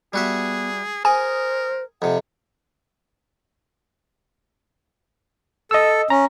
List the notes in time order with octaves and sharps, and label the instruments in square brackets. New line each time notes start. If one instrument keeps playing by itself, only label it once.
[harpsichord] G3 F#4 E5 [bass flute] B3 [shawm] G#4
[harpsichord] G#4 [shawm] A#4 [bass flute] C5 [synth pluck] G#5
[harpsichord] F2 C3 [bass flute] F#5
[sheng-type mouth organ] A4 [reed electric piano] D#5 E6
[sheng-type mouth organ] C#4 [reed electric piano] A#5